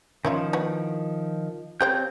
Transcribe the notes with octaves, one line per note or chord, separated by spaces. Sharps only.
D#3 F3 C#4 E4 F4
E3 B3 F#4
C4 G4 C5 C#5 G5 G6